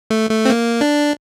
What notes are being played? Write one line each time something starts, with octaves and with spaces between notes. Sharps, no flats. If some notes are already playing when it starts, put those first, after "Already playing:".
A3
A3
C4
A#3
D4